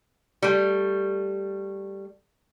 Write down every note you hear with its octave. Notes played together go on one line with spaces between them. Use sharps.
G3 A3